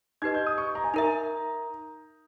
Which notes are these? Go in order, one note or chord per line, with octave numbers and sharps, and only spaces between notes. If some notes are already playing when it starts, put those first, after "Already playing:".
D#4 G4 B4 D#5 G#6
G6
D#6
C#6
A#5
G#5
D#4 A#4 E5 A#5